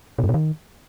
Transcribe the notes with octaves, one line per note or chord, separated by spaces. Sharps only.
B2
G2
B2
D#3